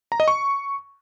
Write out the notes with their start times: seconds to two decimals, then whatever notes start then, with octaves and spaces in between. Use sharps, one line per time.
0.12 A#5
0.20 D#5
0.28 C#6